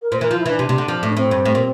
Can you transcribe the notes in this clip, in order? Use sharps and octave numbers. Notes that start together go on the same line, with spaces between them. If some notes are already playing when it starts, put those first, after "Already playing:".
A#4
A#2 C5
E3 A#4
F3 F4
E4
E3 D4
C3
C3
D3
F3
A2
A2 C4
G2
A2
A#2